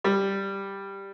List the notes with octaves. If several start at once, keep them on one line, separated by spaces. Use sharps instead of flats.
G3